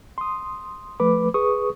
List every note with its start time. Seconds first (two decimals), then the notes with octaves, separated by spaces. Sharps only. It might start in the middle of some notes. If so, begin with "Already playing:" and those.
0.18 C6 D#6
1.00 F3 A3 B4 B5 D6
1.34 G#4 B4 C#6 D#6